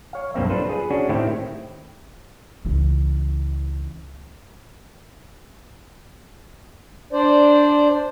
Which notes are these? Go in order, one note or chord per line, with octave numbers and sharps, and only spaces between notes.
C#5 F5
B1 G2 A#3 C4 E5
D4 F4 A4 B4 C5
G#4 B4
C#4 D4 F#4 G#4
A2 D#3 A3 C4 E4 G4
C#2 E3
D4 C5 D5